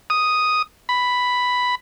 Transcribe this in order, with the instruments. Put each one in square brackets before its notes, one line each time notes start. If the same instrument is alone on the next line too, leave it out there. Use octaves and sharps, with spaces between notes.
[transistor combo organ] D#6
B5